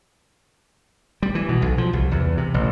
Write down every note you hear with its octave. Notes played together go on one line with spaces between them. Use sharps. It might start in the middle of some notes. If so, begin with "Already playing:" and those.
G3
E3
B2
B1
F3
C2
E2
C3
A1